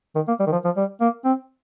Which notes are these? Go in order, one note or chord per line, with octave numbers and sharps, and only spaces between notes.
D#3
A#3
G3
D#3
F3
F3
G3
A#3
C4